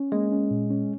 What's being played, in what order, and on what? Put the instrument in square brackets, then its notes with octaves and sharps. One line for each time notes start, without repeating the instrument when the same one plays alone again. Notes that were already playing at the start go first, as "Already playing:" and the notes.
Already playing: [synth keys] C#4
[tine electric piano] G#3 [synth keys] A#3
[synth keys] C#4
A#2
C#4